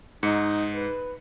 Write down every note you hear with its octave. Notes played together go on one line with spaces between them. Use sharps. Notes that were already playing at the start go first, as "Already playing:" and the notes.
G#2 D#4 C#7
B4